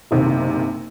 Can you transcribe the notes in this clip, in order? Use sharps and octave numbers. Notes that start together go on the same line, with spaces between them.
F#1 B1 C3 D#3